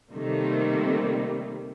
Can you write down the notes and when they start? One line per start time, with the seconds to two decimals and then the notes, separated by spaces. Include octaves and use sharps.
0.13 C3 D#3 G3 A3 A#3